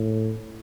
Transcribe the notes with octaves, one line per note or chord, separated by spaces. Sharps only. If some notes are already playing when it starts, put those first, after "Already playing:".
Already playing: A2